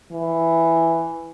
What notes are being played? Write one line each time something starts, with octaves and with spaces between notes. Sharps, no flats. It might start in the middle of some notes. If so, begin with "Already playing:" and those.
E3